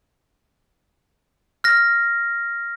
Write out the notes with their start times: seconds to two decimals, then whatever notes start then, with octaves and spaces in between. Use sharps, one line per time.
1.64 F6 A#6